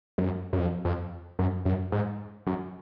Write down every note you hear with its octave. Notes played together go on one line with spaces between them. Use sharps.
F#2
F#2
F2
F2
F#2
F#2
G#2
F#2